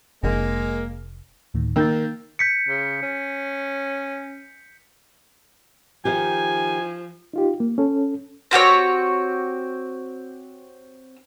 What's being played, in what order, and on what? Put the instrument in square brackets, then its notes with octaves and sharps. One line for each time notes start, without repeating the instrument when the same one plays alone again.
[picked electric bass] F1 [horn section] G#3 A#3
[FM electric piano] D2 A2 D#3
[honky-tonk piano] D#3 A#3 [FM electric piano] E6 G6 A6
[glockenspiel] G6 B6 C#7
[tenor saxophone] C#3
C#4
[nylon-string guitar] D#3 D#4 G4 [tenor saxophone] F3 [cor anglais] G#5
[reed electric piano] D#4 F4 G4
A#3
C#4 A4
[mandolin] C4 F#4 G4 C#5